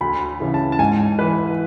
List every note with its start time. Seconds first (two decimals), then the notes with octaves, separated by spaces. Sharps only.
0.01 D2 B5
0.40 C#3 E3
0.54 A5
0.72 A5
0.79 G#2 G#5
1.18 E3 B4